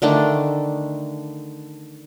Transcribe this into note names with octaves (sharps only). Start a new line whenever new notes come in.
D3 D#3 A3 D4